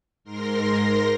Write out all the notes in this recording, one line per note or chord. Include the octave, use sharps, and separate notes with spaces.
G#2 A#4 C6 A#6